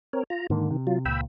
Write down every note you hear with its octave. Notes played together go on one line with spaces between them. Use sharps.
C4 A#4 C#5
F4 A#5
G#2 D3 D#3 A#3
C3
F#3 F4
C#2 A#2 G5 B5 E6